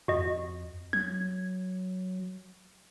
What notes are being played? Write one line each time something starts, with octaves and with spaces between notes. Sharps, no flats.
F2 F#4 D#5
F#3 G#6